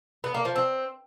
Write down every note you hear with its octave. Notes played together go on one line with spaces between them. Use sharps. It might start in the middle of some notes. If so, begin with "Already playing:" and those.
B3
A#3
F3
C4